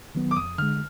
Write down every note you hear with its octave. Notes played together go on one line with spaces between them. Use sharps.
D#3 F#3 B3
D6
F2 D#6
D3 G#3 F6